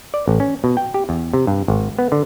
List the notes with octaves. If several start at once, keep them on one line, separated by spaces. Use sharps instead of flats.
D5
A1
C#4
B2
G5
G4
E2
C3
G2
G#1
B3
D3